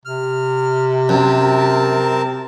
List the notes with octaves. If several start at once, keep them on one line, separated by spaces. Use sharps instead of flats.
C3 F6
F#2 C4 A#4 A5